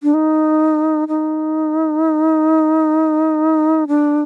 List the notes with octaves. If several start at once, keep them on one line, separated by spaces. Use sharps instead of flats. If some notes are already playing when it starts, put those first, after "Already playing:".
D4
D#4
D#4
D4